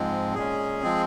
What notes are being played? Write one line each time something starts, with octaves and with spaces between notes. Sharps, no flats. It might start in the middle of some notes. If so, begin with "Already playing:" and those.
Already playing: G#2 F3 G#3 C4
A#2 G#3 C#4 G#4
F3 G#3 C4